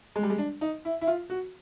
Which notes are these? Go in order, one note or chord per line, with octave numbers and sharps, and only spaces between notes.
G#3
G3
G#3
D4
D#4
E4
E4
F4
F#4